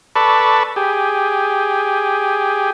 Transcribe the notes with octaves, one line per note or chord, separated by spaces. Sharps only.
A4 B4 D5 A5 B5 C#6
G4 G#4